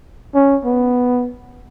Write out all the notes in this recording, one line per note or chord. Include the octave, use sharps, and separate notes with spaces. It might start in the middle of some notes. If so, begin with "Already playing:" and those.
C#4
B3